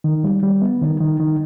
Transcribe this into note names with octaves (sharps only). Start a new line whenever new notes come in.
D#3
G3
G3
B3
D#3
D#3
D#3